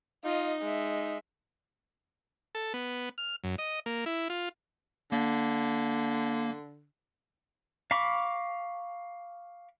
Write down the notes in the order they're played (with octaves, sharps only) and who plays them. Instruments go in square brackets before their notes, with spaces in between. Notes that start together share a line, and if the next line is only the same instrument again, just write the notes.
[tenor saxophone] D#4 [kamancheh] F4 D#5
[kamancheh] G#3 E5
[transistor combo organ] A4
B3
F6
F#2
D#5
A#3
E4
F4
[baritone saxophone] D3 [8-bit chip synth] A#3
[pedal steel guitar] F5 A#5 B5 C#6 D6